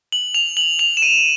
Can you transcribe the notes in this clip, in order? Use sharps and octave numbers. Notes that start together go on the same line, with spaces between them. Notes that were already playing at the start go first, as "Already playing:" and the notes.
F#7
F7
F#7
F7
E7
D#7